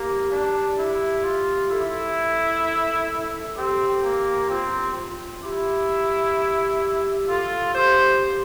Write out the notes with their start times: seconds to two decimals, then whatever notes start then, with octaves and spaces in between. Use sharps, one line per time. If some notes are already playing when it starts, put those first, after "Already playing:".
Already playing: A#3 G4
0.32 D4
0.78 E4
1.24 F4
1.71 E4 A4
3.56 C4 G4
4.03 A#3
4.49 C4 F4
4.96 F4
5.43 E4 G4
7.29 F4 A4
7.75 G4 C5